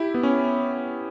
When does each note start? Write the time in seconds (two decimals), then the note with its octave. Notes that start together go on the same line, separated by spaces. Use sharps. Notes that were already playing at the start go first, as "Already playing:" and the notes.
Already playing: E4 G4
0.14 B3
0.23 C#4